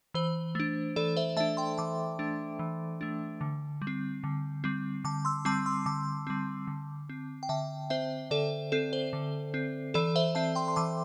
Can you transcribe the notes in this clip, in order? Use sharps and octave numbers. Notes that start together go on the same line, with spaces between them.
E3 C5
A3 D4
E3 A4 D5
C5 E5
A3 D4 E5 A5
G5 C6
E3 A5 D6
A3 D4
E3
A3 D4
D3
G3
C4
D3
G3 C4
D3 A5 D6
C6 E6
G3 C4 A5 D6
C6 E6
D3 A5 D6
G3 C4
D3
C4
G5
D3 E5 A5
C4 C5 E5
D3 A4 D5
C4 A4
C5
D3
C4
E3 A4 D5
C5 E5
C4 E5 A5
G5 C6
C6
E3 A5 D6